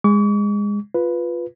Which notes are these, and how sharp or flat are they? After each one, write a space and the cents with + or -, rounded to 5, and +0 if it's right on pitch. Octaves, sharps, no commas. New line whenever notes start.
G#3 -20 C#6 +45
F4 +5 B4 +0